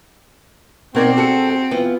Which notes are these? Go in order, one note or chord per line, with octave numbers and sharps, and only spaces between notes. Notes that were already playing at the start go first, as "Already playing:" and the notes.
B2 C4 D#4 F#4 A#4 D5 G#6
F#4 G#4 A4 C#7
F#4 G5
E3 B3 F4